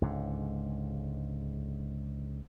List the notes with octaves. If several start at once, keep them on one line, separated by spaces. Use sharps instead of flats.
C#2 G#2 D3